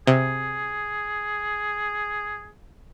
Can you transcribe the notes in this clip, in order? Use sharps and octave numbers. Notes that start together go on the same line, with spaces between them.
C3 G#4